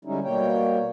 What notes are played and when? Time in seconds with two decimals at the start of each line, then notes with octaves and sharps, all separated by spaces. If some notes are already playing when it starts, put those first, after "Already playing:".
0.05 D3 G3 G#3 C#4 D#4 E4
0.24 B2 G3 A#3 C#5 G5